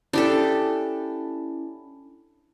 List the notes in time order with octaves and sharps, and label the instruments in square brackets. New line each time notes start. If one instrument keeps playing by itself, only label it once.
[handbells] C#4 E4 [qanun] D4 G4 A4